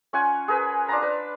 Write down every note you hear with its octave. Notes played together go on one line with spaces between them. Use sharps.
C#4 F4 F#5 G#5
G#4 A#4 B4
D4 F4 A5 A#5
B4